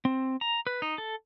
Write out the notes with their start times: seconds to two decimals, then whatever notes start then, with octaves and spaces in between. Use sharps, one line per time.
0.05 C4
0.41 A#5
0.67 B4
0.82 D#4
0.98 A4